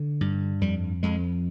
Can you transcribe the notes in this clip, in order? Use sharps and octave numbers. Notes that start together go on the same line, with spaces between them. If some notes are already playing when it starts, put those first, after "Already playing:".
Already playing: D3
G2
F2 G3
F2 G#3